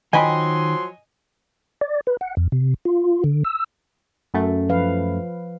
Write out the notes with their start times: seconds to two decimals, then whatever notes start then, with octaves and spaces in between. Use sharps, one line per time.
0.13 D#3 F3 F#3 D#5 G5 G#5 B5 C6
1.81 D5
2.07 B4
2.21 F#5
2.37 F2
2.52 C3
2.85 F4
3.24 D3
3.44 E6
4.34 F#2 A3
4.69 F3 B4 F5